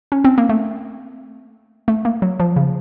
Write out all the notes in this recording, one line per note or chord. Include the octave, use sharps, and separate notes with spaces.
C#4
C4
A#3
A3
A3
A#3
F#3
F3
C#3